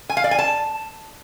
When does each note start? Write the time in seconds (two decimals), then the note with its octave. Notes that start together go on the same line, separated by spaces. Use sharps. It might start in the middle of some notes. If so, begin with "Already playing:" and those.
0.09 G#5
0.17 F5
0.24 D5
0.31 G#5
0.39 A5